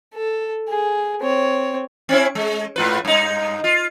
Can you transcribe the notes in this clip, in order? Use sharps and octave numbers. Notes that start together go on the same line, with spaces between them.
A4
G#4
C4 C#5
C4 C#4 E4
G#3
G#2 F4 B4
G2 D#4
F4